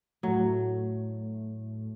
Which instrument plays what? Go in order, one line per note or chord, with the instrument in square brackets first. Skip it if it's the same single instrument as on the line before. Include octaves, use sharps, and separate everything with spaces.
[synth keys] A2 A3 [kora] F#3